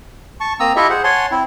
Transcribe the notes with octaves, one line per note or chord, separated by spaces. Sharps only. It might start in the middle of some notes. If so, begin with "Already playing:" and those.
A5 C#6
A#3 C4 A#5 D#6 E6
E4 F4 G4 A4 D#5 E5
G#4 C5 F#5
C#5 F#5 G#5 A5 C6
C4 E4